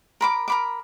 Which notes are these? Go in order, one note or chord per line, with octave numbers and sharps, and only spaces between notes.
A#4 B5 D6
A#4 B5 D6